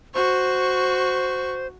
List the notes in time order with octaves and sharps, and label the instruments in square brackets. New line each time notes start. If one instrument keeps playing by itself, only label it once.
[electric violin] F#4 C#6 [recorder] C5